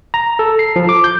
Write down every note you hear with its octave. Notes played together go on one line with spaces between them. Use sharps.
A#5
A4
C7
F3
D6
G6